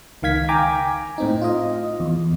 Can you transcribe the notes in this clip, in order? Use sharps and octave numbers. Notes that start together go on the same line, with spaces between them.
C#2 D#3 F5 G#6 B6
G5 G#5 A#5 D6
A2 C4 D#4
F4 D#5
E2